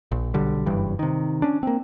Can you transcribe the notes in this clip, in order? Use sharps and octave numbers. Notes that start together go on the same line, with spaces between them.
A#1
B1 D3 G3
F#1 G2 E3 G3
C3 D#3
C#4 D4
A#3 C4